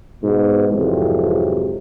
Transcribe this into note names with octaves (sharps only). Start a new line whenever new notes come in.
G#2 B2
F2 G#2 C3 E3 F#3